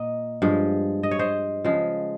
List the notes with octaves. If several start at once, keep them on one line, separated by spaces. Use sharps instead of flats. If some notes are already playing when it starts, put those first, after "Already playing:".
Already playing: A#2 A#3 D#5
G2 F3 G#3
D#5
C#5
C5 D#5
C#3 F3 G#3